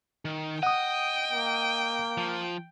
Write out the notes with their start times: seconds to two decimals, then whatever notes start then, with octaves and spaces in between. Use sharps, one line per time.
0.25 D#3
0.63 D#5 F#5 G5 D#6
1.32 A#3
2.17 F3